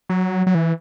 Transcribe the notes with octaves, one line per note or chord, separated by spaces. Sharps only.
F#3
F#3
E3